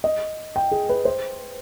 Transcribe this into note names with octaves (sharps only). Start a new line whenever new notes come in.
D#5
G5
G#4
B4
C5